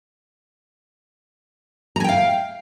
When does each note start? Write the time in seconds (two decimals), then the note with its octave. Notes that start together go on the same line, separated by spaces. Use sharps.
1.96 A#5
2.00 G#5
2.04 G5
2.09 F5